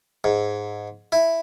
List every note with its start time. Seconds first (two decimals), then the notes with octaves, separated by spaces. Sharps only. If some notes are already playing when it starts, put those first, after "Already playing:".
0.24 G#2
1.12 E4